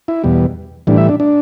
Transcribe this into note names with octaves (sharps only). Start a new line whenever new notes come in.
E4
E2 B2 G3
A2 E3 G3 D4
E5
D4
D4